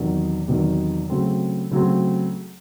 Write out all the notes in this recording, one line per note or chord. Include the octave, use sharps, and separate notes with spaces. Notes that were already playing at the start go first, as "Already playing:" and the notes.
Already playing: E2 C3 D#3 F#3
E2 C3 D#3 F#3
C#3 F#3 A3 C4
C#3 F#3 A3 C4